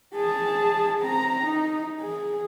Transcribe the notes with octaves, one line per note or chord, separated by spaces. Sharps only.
G#4 A5
C4 A#5
D#4
G#4